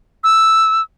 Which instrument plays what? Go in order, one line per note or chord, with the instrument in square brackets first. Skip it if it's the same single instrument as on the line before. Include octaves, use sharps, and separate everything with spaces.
[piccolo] E6